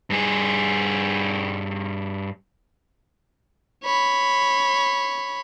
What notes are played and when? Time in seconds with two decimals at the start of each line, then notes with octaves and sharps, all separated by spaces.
0.10 G2 G#4
3.84 C#5 B5